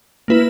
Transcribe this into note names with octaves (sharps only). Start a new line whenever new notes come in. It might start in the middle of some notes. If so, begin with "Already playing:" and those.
A#3 E4 B4